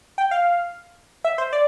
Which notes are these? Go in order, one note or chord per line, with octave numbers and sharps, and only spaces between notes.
G5
F5
E5
C5
D5